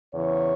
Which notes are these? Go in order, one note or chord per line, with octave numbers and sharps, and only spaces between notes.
E2 C#3 E3 C#5